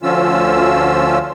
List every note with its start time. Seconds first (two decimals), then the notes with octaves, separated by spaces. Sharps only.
0.03 D2 D3 F3 C#4 F4 E6